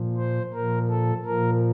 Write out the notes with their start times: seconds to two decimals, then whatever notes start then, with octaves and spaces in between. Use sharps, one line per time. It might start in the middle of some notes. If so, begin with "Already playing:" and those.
Already playing: A#2 F3
0.17 C5
0.54 A#2 F3 A#4
0.89 A4
1.25 A#2 F3 A#4